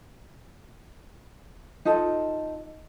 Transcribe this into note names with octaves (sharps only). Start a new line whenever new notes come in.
D#4 F4 A4